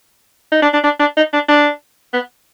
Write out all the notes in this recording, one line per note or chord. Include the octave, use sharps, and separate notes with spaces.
D#4
D4
D4
D4
D4
D#4
D4
D4
B3